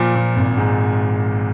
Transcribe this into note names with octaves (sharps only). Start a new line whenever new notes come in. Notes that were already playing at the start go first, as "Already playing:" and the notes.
Already playing: A#2 F3
A#2
G#1
G#2